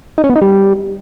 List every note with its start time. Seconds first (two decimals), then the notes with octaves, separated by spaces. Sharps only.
0.18 D#4
0.24 C#4
0.30 B3
0.36 D#4
0.41 G3